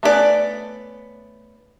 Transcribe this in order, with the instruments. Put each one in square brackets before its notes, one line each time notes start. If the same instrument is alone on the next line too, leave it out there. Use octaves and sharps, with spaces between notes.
[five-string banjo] A3 B3 C#4 G#4 D5